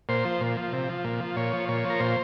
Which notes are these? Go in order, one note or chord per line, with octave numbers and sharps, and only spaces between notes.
A#2 C5
F3
A#2
F3
C3
F3
A#2
F3
A#2 C#5
F3
A#2 C#5
F3
A#4
A#2 C5